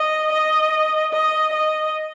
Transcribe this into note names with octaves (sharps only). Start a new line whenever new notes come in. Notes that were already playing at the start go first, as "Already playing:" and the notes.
Already playing: D#5
D#5
D#5
D#5